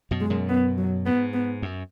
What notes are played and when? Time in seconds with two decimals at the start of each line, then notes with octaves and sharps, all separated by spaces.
0.11 F#2 B2
0.21 G#3
0.30 F#2 B2
0.49 B3
0.78 F#3
1.06 G#2 B3
1.34 B3
1.62 F#2